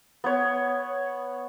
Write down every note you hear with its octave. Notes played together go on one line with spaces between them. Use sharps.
B3 C#5